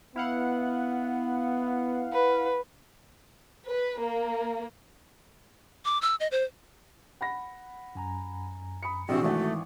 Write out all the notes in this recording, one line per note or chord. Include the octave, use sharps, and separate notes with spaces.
B3 E4 F5 F#5
B4
B4
A#3
D6
E6
D#5
C5
F#5 B5 A#6
F#2 G#5 A#5
B5 D#6 C#7
A#1 C3 E3 C4 F#4
G#1 E3 A3